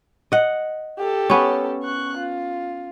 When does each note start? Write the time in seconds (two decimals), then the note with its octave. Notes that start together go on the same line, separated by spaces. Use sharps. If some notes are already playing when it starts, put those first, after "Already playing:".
0.32 D#5 F#5
0.98 G4 A4
1.30 B3 C#4
1.83 C#6 F#6
2.17 F4